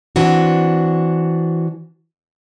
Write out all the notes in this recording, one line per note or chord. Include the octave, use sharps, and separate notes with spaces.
E3 C4 D4 F#4